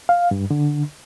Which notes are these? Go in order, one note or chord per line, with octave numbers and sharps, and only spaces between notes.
F5
G2
D3